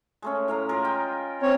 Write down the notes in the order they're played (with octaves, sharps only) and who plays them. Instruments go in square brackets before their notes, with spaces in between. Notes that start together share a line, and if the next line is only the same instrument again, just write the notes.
[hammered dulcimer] G#3 A3 C#4
A2 F5 A#5
G#3 F4 A#4
D#5 G5 G#5
[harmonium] C4 C#5